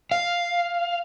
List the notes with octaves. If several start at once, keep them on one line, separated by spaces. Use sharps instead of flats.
F5